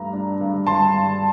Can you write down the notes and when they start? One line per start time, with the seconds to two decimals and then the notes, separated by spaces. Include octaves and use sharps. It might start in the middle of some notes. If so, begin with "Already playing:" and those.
Already playing: G2 A3 A#5
0.13 D4
0.41 G2
0.67 G2 A5 C6
0.94 G2